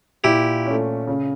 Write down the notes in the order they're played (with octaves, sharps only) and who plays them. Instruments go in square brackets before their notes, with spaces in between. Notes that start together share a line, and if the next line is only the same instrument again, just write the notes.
[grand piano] A#2 [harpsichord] E4 G4
[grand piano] A3 C#4
C#3